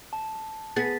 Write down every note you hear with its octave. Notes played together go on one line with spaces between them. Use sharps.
A5
B3 G#4 A6 B6